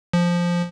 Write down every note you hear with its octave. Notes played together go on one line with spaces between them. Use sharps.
F3